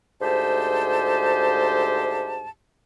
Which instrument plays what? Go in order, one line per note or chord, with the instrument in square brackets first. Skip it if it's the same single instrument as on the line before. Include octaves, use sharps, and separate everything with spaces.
[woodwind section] D2 G#2 G4 C5 A5